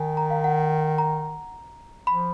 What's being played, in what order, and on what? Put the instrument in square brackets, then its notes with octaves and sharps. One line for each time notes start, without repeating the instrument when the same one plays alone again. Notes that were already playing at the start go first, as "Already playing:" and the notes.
Already playing: [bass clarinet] D#3 [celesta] G#5
[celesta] A#5
F5
F#5
A#5
[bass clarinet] F3 [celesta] B5